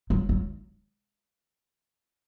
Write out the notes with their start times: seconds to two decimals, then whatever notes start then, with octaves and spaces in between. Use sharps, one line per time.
0.10 F#3
0.29 F#3